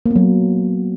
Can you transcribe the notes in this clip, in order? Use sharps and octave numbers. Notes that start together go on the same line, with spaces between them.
A#3
B3
F#3